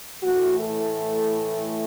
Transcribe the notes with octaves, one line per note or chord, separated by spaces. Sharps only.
A2 E3 A3 F#4
A4